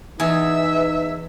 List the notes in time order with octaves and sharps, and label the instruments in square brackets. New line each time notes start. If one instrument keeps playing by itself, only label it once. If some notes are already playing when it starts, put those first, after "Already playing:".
[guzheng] E2 G#4 [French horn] D#4 [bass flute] B4 [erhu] E5